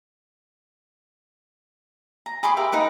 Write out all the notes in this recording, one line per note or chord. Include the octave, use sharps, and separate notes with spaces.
A#5
G#4 B5 C6 D6
G4 A#4 E5 F5
D#4 A#4 B4